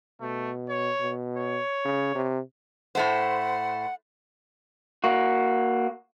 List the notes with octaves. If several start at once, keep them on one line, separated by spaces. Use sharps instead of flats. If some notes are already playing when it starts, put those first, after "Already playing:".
B2 A3
C#5
B2
C#5
C#3
C3
A2 A3 C5 F#5
A#3 F#4